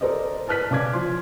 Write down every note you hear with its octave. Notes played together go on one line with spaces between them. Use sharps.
A4 A#4 C5 D5 D#5
B4 A5 F6 F#6 B6
C#3 D5 D6 G#6
F3 C6